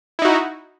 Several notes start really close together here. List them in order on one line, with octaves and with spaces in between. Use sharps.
E4 D#4 F#4